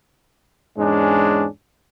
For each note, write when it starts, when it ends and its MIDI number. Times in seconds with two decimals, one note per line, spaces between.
0.78 1.47 40
0.78 1.47 44
0.78 1.47 56
0.78 1.47 61
0.78 1.47 62